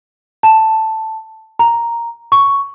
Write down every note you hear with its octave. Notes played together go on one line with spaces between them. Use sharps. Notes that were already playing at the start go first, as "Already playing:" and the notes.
A5
A#5
C#6